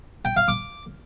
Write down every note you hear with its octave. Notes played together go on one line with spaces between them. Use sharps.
G5
F5
D6